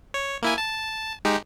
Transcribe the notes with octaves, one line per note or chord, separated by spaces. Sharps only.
C#5
A#3 E4 G#5
A5
G#3 D#4 G4